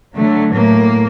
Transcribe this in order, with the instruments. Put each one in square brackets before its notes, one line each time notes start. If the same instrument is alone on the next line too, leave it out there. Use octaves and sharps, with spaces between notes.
[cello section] D3 F#3 [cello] A3
[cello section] A2 [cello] A#3